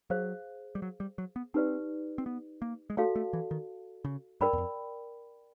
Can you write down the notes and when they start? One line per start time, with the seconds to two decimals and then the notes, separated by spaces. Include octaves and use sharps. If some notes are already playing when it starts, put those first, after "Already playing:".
0.10 F#3 G#4 C5 F5
0.75 G3
0.82 F#3
1.00 G3
1.18 F#3
1.36 B3
1.54 C4 D#4 G4 B4 D5
2.18 C4
2.26 B3
2.62 A#3
2.90 G#3
2.97 A3 F#4 A4 D5 F5 A5
3.16 A3
3.33 E3
3.51 D#3
4.05 C#3
4.41 G2 A#4 D5 G5 B5
4.53 E2
4.58 F2